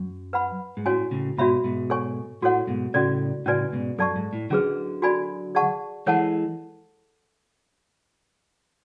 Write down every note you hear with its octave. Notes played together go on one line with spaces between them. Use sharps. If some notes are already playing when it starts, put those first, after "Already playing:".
Already playing: F#2
B4 F#5 B5
G#2
A2 C#4 F#4 C#5 G#5
A2 C#3
G#2 B2 F#4 C#5 E5 B5
G#2 B2
A4 C#5 G#5 C#6
A2 F#4 A4 C#5 F#5
G#2 B2
A2 C#3 C#4 F#4 A4 D5
A2 C#3 C#4 F#4 B4 D5 G#5
G#2 B2
F#2 A4 D5 A5 C#6
G#2
A2
D3 F#3 C#4 G#4 B4
F#4 A4 D5 G#5 B5
G#4 D5 F#5 A5 C#6
E3 G#3 A4 C#5 F#5 A5